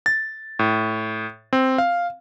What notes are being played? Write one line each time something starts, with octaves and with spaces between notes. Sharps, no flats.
A6
A2
C4
F5